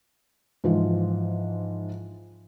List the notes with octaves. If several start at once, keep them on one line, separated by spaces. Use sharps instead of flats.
G#2 E3 F3